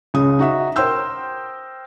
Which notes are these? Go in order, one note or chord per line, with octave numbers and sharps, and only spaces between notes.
C#2 C#3 D#6
D#4 F#4 E5
A#4 C5 G5 C6 E6 G6